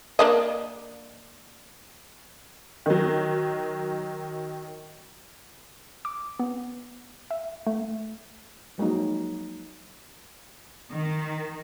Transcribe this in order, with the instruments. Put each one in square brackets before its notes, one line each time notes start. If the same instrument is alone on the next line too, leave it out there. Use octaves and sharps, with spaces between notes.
[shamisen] A#3 D4 D#5
[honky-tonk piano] D#3 F#3
[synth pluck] D6
B3
E5
A3
[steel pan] F3 F#3 G#3 A#3 D#4
[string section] D#3